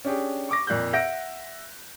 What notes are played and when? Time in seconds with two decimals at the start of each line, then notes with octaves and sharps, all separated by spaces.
0.05 C#4 D4 G4 G#4
0.49 C#6 D6 A#6
0.67 F2 A#2 F#6 G6
0.93 E5 F#5 G6 A#6 D7